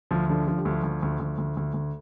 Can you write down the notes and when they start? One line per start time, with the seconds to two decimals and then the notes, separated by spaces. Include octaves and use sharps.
0.11 D2 F3
0.29 D3 F3
0.47 D3 F3
0.57 G3
0.65 D2 F3
0.83 D2
1.02 D2
1.20 D2
1.38 D2
1.57 D2
1.74 D2